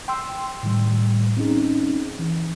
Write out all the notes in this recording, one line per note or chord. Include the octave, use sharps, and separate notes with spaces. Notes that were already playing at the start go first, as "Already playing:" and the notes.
G5 C6 E6
A2 D#3 G3
C4 C#4 D#4 G#4
E3